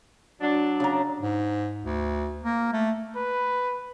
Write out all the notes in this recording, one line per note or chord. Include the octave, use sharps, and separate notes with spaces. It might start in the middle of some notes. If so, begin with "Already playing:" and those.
F#3 D4
C#3 A#5
G#2
D2
A#3
A3
B4